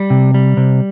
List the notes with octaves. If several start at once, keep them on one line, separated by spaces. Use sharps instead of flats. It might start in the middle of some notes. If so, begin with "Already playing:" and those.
Already playing: G3
C3
G3
C3